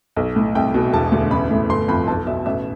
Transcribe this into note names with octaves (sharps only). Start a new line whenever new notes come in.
B1
A2
C2 G5
B2
E1 A5
D2
A1 B5
A2
G1 C6
F2 B5
B1 A5
B2 E5
A1 E5